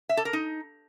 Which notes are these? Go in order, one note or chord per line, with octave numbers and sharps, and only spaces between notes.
E5
A4
A#4
D#4